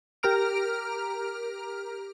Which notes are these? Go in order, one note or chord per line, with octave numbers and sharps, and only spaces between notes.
G4 A#4 A#5 F6 D7